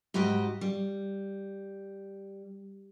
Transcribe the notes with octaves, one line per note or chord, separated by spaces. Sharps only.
G#2 G3 F#4 G4 D#5
G3